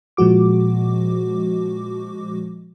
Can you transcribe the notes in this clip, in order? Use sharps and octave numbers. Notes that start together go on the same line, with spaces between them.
A#2 F3 G#3 F#4 D6